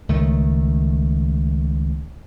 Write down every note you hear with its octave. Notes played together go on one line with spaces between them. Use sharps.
C#2 D#3 A3